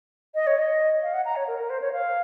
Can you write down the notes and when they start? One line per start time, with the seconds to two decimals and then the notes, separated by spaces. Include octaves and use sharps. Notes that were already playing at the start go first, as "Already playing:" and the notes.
0.35 D#5
0.47 C#5
0.59 D#5
1.02 F5
1.13 F#5
1.25 A#5
1.36 C#5
1.48 A#4
1.59 A#4
1.70 C5
1.81 C#5
1.93 F5